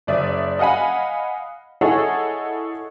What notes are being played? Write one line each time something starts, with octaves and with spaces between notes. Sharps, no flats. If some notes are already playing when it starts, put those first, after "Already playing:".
F#1 D5 E5 D#6
D#5 F5 F#5 G#5 B5
E4 G#4 A4 C#5 D#5 F#5